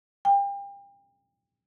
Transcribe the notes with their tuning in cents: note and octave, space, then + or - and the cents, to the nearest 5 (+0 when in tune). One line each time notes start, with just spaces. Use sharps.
G5 +35